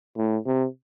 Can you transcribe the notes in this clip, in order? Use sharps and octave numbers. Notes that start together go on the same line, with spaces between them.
A2
C3